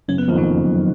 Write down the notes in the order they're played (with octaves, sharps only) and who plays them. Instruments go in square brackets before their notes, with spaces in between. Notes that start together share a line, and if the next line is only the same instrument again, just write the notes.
[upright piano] F#1 [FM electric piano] C#4
[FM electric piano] B3
[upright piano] F2 D#3 [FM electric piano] A#3
[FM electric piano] F#3
[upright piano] F#1
D#3